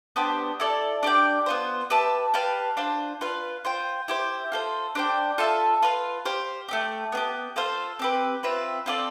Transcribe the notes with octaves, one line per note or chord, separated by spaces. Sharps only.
B3 D4 G4 C5
E4 A4 D5
D4 G4 D5 G5
B3 F4 C5
G4 B4 E5 A5
G4 B4 F5 A5
D4 F4 C5
F4 B4 F5
F4 C5 G5
E4 G4 C5
F4 A4 C5
D4 G4 C5 G5
F4 A4 E5 A5
F4 B4 F5
G4 C5 F5
A3 C4 G4
B3 D4 G4
F4 A4 C5 F5
C4 G4 B4
C4 F4 B4 E5
C4 F4 A4 D5